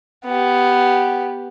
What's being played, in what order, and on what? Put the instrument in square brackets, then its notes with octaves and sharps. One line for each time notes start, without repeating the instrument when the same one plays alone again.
[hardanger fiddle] B3 G4